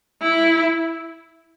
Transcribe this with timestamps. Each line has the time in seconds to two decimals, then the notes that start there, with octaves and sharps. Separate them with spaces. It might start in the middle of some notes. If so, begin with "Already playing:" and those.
0.22 E4